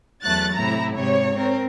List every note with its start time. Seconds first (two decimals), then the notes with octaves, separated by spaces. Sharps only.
0.23 E2 F#3 A3 F#6 A6
0.55 A2 C3 E4 A#5
0.95 G#2 C3 C#5
1.34 C4 A#4